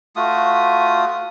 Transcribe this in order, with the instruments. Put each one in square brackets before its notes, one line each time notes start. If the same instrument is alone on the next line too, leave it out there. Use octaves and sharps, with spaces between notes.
[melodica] A3 F4 F#4 D#6